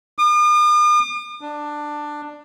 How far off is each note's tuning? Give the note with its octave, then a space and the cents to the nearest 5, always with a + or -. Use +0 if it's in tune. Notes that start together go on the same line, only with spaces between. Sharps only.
D#6 -45
D4 +10